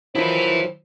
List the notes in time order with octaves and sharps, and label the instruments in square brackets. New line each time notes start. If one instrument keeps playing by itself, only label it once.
[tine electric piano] D#3 F3 F#3 [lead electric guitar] E4 B4 [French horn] C5